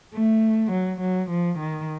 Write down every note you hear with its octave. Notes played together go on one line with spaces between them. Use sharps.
A3
F#3
F#3
F3
D#3